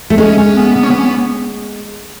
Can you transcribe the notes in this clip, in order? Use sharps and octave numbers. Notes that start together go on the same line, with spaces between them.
A3
G#3 C#4
C#4
B3
B3
C#4
B3
C#4
B3